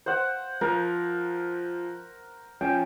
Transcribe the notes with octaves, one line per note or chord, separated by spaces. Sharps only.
C5 F#5
F3 A#4
F3 C#4 G5